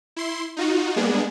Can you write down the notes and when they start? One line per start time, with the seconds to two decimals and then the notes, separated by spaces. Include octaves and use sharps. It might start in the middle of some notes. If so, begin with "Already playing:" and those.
0.16 E4 C6
0.57 D#4 F4 F#4
0.96 G3 G#3 A#3 B3 D4 G#4